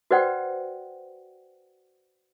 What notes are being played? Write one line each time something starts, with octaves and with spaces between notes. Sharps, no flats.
F#4 B4 C5 D5 F#5 G5